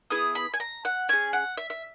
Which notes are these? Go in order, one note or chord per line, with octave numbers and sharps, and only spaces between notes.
B3 E4 G#4 D#6
B5
G#5
A#5
F#5
C#4 G#4 G#5
F#5
E5
E5